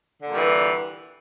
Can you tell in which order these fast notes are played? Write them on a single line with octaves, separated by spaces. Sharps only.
D3 A#2 G3 E3